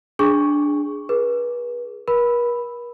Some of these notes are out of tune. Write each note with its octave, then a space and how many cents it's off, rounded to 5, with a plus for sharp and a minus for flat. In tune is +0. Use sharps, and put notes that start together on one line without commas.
D4 +0 G#4 +0 C#6 +0
G#4 +0 B4 -35
A#4 +45 B5 +0